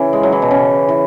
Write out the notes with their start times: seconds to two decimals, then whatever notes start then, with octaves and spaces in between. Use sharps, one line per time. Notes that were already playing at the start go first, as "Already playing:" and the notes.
Already playing: C#3 E3
0.13 G#3
0.23 F#3
0.32 E3
0.42 B2
0.51 C#3
0.89 E3